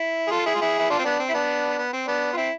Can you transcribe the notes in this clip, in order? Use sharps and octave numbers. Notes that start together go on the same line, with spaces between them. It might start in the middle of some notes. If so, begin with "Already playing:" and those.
Already playing: E4
G#4
F4 A4
E4 G#4
F4
E4 G#4
E4
D4 F4
C4
B3 D4
C4
E4
B3 D4
B3
C4
B3 D4
F4
C4 E4